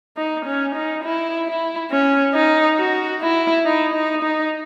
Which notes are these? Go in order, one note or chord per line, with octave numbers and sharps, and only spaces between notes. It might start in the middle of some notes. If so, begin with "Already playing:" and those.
D#4
C#4
D#4
E4
E4
C#4
D#4
F#4
E4
D#4
D#4
D#4